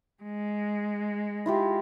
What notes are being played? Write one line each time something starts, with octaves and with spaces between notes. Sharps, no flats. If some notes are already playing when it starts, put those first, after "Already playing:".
G#3
E4 F4 G4